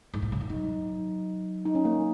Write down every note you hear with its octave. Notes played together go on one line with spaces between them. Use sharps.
G#2
A#2
C#3
D#3
F#3 D#4
D#4
C#4
A#3